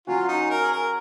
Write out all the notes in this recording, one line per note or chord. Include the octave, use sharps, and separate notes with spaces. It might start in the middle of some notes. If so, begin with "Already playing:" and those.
F#3 C#4 F4 F#4
D#4
A#4
G#4
A#4